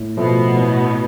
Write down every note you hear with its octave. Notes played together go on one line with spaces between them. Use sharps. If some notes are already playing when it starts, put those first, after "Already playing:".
Already playing: A2
B2 F3 A3 B3
A2